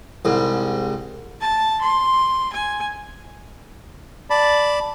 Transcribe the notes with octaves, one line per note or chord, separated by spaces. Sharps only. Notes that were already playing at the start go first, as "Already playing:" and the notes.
C2 G#2
A5
C6
G#5
D5 A5 B5